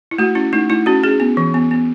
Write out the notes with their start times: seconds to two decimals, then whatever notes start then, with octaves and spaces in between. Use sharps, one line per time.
0.11 E4
0.18 A3 F#4
0.35 C#4 E4
0.53 A3 D#4
0.70 A3 E4
0.86 C#4 F#4
1.03 C#4 G#4
1.20 B3
1.37 E3
1.54 B3
1.71 B3